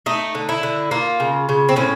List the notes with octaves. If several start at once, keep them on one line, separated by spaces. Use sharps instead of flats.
A3 D#4
D3
E4
D3
A#3 F4
C#3
C#3
C4
A2 C#4